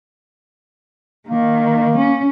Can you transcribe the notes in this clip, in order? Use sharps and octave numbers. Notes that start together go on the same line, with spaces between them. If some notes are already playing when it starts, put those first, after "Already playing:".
D#3 A#3
C#4